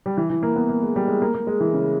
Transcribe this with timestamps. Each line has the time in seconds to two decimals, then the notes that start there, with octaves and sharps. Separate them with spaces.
0.06 G3
0.17 E3
0.30 E3
0.43 A#3
0.56 B3
0.69 A#3
0.82 G#3
0.96 G3
1.08 G#3
1.22 A#3
1.35 A#3
1.47 G#3
1.60 E3
1.73 C#3